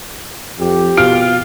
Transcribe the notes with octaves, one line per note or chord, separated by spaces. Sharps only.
F2 G4
B2 F4 F6 D7